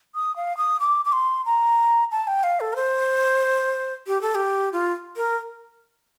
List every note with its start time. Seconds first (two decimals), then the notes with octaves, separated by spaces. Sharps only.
0.15 D#6
0.36 F5
0.57 D#6
0.80 D6
1.05 D6
1.12 C6
1.45 A#5
2.11 A5
2.27 G5
2.43 F5
2.60 A4
2.73 A#4
2.76 C5
4.07 G4
4.21 A4
4.35 G4
4.73 F4
5.16 A#4